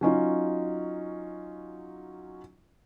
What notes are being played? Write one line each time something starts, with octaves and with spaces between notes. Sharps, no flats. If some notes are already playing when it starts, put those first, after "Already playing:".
F#3 C#4 D#4 F4